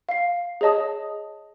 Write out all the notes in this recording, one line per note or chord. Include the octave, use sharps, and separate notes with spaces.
F5 C7
G#4 C#5 D#5 A5 D#6